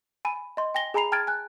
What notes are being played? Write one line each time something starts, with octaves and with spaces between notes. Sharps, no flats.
G#5 B5 D#7
D#5 C6
G5 G#5 A#6 G7
G#4 G#5 A#5 B5 C7 F7
G5 A5 F6 G#6 A6 D7
G#5 F#6